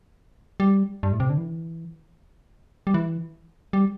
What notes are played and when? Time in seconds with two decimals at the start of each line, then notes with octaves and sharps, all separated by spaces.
0.60 G3
1.03 G2
1.13 A2
1.20 C3
1.30 D3
1.38 E3
2.87 G3
2.94 E3
3.73 G3